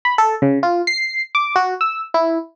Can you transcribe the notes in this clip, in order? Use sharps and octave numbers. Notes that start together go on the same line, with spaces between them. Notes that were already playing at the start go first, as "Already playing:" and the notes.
B5
A4
C#3
F4
C7
D6
F#4
E6
E4